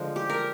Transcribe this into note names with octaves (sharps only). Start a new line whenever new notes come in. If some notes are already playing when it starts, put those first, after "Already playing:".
Already playing: D3 F3 G#3
G4
A#4